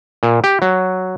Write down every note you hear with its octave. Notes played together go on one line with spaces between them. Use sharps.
A#2
G4
F#3